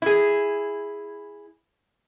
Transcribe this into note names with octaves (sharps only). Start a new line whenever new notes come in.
E4 G#4